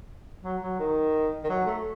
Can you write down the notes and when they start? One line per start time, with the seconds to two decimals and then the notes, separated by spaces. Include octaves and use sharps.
0.44 F#3
0.62 F#3
0.79 D#3
1.44 D#3
1.49 F#3
1.66 A3